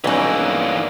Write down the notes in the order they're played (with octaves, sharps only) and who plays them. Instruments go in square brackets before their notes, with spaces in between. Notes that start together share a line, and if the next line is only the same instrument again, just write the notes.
[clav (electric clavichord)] B1 [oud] G2 C#4 [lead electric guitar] E3 A#3